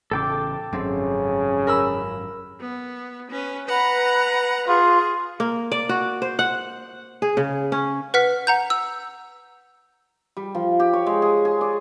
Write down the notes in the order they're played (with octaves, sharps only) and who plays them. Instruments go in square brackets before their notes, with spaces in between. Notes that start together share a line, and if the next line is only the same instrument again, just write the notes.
[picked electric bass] A1 C#3 [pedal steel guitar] A4 G5 D6
[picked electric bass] G#1 F#2 [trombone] C#3 [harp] C4
[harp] A#4 B5 E6
[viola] B3
C#4 B4
[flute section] B4 [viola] F#5 A#5
[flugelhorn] F4 [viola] G#4
[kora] A#3
D5
F#4
C5
F#5
G#4
C#3
C#4
[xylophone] B4 F#5 F6 B6
F#5 A#5 G6
E6
[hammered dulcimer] G3
F3
G4
C#5
G#3
G#4
G#4
D5